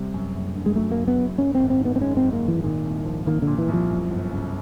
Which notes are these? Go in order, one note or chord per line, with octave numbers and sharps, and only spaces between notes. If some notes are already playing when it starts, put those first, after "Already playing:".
Already playing: C3 G3
F#2
F#1
D3
G#3
F#3 A3
A#3
F#2
B3
F#1
F#2 C#4
G#1 C4
C4
D#3
B3
C4
G#3 C#4
C4
F#2
A#3
G#1 E3
A#2 D#3
C2
F3
D#3 A#3
A#2 D3
E3
C2
F3
F#2
G1
C#3